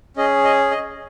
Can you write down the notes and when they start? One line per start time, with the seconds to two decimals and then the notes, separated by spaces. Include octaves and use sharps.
0.17 C#4 G#4 D#5
0.44 D#5
0.71 D#5